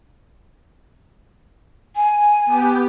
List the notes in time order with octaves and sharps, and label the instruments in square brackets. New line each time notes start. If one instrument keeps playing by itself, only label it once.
[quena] G#5
[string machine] B3 G4